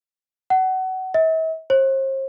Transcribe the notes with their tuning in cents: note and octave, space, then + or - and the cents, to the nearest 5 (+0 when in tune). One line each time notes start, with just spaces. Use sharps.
F#5 +25
E5 -45
C5 +40